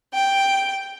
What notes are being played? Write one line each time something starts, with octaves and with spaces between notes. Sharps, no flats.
G5